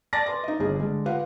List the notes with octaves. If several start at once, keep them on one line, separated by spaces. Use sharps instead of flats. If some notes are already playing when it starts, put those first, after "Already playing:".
D5 G#5 A5 D6 A6 A#6
B4 C6 D6
D#4 D#5
G1 G#4
D3 G#3
F4 G4 B4 F5 F#5